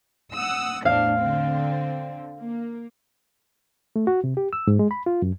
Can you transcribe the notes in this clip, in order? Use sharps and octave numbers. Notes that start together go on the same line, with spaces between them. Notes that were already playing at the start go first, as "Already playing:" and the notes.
F#5 D#6 E6
E2 A2 D4 F5
D3 C4
A#3
A3
F#4
C3
G4
E6
G#2
G#3
B5
F4
F#2